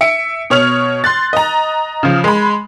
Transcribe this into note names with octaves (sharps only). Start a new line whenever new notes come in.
E5 C#7 D7
B2 C#5 F6 F7
C6 F#6 A6
D#5 A#5
C#3 F3
G#3 B5